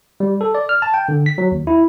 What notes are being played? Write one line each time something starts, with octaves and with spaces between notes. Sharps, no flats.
G3
A4
D5
F6
A5
G5
D3
B6
F#3
D#2
E4